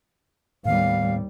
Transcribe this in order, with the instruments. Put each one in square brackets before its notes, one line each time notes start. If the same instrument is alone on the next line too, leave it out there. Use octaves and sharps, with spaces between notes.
[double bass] D#2 G3 [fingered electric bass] A2 D#3 B3 [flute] F5